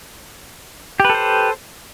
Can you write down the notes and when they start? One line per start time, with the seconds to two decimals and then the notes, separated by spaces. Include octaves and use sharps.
1.00 G4
1.05 B4
1.10 A4
1.15 C5